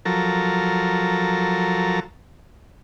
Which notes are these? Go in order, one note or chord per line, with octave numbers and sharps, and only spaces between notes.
F3 F#3 A4 A#4